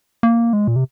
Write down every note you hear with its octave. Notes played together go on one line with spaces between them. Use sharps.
A#3
G#3
A#2
C3